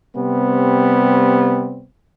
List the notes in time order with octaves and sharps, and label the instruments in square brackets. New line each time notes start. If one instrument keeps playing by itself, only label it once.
[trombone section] C3 G3 B3 C4